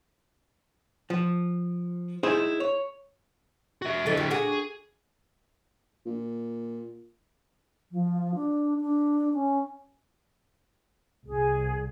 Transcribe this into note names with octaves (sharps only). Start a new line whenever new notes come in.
F3
D#4 E4 G#4 C5
C#5
F#4 E5
F2 D3 E4 A4
G3
D4 F#4 G#4
A#2
F3
D4
D4
C#4
C2 G#4